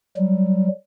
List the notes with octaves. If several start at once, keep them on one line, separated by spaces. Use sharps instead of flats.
F#3 G3